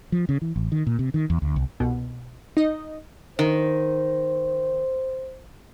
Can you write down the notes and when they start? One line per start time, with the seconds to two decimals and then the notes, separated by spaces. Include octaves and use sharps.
0.12 F3
0.29 C#3
0.42 E3
0.56 A1
0.72 D#3
0.87 A#2
0.99 C3
1.14 D#3
1.30 E2
1.42 D2
1.56 C2
1.80 C2 B2
2.57 D#4 D#5
3.39 D#3 C5